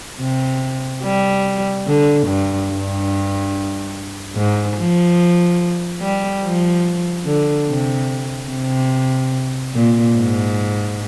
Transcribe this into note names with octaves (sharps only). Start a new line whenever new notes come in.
C3
G3
D3
G2
G2
G#2
F3
G3
F3
D3
C3
C3
A#2
G#2